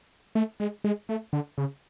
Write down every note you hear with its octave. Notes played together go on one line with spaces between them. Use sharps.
A3
G#3
G#3
A3
D3
C#3